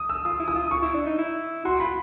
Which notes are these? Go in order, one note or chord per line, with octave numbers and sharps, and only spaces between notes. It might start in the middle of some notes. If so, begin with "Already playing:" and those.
Already playing: D#6
E6
F4 D#6
E4
D#6
F4
C#6
E4
D4
D#4
E4
F#4 C6
F4 B5